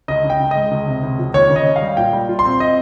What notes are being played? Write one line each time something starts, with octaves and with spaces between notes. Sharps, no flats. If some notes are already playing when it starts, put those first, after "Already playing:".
C#2 D#5
C#3
G5
C#2
G#3 D#5
C#2
C3
C#2
F3
D#2 C#5
C#3
D#5
C#4
F5
G3
A#2 G5
G3
F4
C6
C4
D#5